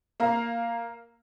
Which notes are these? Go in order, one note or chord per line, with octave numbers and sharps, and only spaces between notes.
A#3 F5 A#5